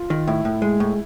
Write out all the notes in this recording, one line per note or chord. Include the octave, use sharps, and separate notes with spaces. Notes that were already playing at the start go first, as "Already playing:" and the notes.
Already playing: F4
D#3
A2 E4
A2
G#3
A2